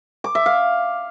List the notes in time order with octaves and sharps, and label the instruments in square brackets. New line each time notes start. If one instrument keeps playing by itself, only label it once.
[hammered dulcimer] D6
E5
F5